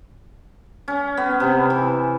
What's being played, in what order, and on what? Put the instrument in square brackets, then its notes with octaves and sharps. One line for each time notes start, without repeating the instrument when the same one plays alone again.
[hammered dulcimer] C#4
B3
C3
E3